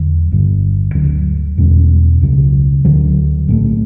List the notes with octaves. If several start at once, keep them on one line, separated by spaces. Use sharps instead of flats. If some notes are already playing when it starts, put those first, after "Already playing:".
Already playing: E2 D3 F#3
G1 G2 D3
D2 D3 F#3
E2 B2 G3 C#4
C#2 C#3 F#3
D2 D3 F#3
B1 A2 E3 A3